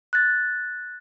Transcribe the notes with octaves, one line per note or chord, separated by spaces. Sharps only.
F#6 A6